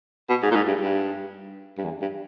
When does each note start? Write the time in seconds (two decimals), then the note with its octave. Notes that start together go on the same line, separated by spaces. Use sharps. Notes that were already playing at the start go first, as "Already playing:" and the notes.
0.29 B2
0.42 G#2
0.51 A#2
0.56 G#2
0.68 G2
0.81 G2
1.78 G2
1.85 E2
2.01 G2